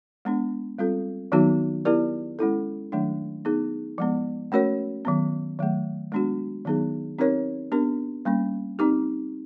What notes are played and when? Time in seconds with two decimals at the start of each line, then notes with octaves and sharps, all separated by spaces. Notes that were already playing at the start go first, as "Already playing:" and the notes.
0.25 G#3 B3 D4
0.78 G3 C4 F4 A4
1.32 D#3 F#3 B3 D#4 F#4
1.85 B3 E4 G4 A#4 D5
2.39 G#3 C#4 E4 A4
2.92 D#3 F#3 A3 D4
3.45 B3 D#4 G#4
3.98 F3 G#3 B3
4.52 A3 C#4 F#4 A#4 C#5
5.05 D#3 F#3 B3
5.59 D#3 F#3 A3
6.12 G#3 B3 D4 F#4
6.65 D#3 F#3 B3 D#4 G#4
7.19 C4 D#4 G4 A#4 C#5
7.72 B3 D4 G4 A#4
8.25 G3 A#3 C#4
8.79 C4 D#4 G4